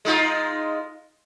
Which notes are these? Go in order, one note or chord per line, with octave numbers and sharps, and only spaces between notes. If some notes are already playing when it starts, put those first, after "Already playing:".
G#3 D#4 F4